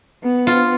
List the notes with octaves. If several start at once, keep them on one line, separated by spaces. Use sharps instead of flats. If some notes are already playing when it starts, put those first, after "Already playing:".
B3
F4